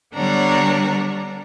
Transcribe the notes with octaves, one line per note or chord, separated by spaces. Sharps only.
D3 G3 B3 D4 C#5 A#5